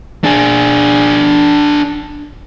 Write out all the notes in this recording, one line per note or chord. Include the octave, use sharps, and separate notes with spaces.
D4 G#4